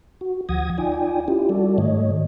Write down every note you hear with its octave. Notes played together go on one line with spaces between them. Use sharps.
F#4
D2 F3 F#5 D#6 G#6 A#6
D#4 F4 D5 G5 G#5
C#4 E4 F4 G4
G3 F#4 A4 D5
G#2 D#3 A3 C#5 D#5